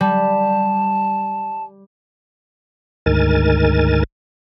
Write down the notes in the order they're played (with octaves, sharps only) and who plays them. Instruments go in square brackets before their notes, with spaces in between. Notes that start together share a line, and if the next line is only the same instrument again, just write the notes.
[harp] G3 [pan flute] A5
[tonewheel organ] D2 G#2 D#3 A#4 G#5 A6